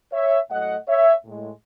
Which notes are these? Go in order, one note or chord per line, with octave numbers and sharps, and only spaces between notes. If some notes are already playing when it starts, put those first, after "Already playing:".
C#5 E5
A2 F#3 A3 D#5 F#5
C#5 E5
A2 G#3